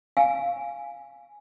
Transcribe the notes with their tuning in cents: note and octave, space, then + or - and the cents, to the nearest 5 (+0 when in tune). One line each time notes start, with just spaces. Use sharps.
F5 +0 G#5 +0